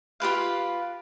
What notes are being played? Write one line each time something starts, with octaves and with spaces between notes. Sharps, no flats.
F4 G4 B4 F5